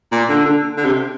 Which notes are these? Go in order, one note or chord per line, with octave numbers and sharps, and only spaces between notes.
A#2
D3
D3
D3
C3